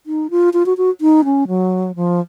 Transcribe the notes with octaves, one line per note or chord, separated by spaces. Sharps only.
D#4
F4
F4
F#4
F#4
D#4
C#4
F#3
F3